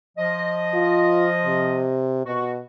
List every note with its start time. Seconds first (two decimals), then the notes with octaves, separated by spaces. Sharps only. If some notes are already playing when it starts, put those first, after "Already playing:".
0.18 F3 D#5
0.74 F4
1.46 C3
2.26 B2 F#4